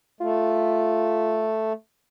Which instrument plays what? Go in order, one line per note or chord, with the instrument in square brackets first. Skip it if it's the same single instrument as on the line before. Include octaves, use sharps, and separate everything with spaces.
[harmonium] A3 [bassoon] F4